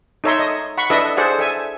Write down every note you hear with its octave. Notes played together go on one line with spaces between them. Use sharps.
D#4 A4 C#5 E5 A#5 C6
D#5
F#5 B5 C#6
D4 E4 A4 B4 D#5 E5
G#4 A4 C5 D5 F#5
A4 E5 G#5